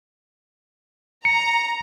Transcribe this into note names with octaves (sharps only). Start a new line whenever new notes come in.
A#5 C#7